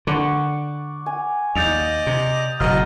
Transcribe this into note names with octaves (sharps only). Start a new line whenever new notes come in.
D3 D5 F#5 C#6
G#5
D#2 D5 D#5 G6 A6 F7
C3
F#1 B2 D#5 F#5 A#5 F6